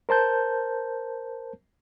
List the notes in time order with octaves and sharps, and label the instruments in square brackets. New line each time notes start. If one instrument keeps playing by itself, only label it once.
[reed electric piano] A#4 C5 A5 G6